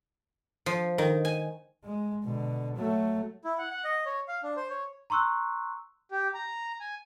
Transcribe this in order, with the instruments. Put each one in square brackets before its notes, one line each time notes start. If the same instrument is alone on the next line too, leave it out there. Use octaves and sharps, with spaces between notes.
[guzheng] F3
D#3
G#5
[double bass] G#3
B2 D3
F#3 A3
[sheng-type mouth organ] E4
F#5
F#5
D#5
C#5
F5
D4
C5
C#5
[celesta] A#5 C6 C#6 E6 F#6
[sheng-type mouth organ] G4
A#5
G#5